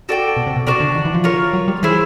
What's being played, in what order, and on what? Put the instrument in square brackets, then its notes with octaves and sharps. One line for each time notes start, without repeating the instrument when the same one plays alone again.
[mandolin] F#4 A4 D5 G5
[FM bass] B2
C3
B2
[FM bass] C3 [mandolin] D4 F#4 A#4 D5
[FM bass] D3
D#3
E3
F3
[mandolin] F4 A#4 C#5
[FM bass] F#3
G3
[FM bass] E3 [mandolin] E4 G#4 C5